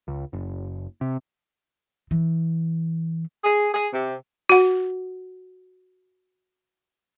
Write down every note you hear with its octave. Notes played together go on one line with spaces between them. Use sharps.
C#2
F#1
C3
E3
G#4
G#4
C3
F#4 F#5